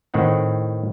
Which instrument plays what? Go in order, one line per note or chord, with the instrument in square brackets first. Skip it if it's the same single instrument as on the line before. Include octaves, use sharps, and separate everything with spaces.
[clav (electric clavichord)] A2 D#3 C4 F#5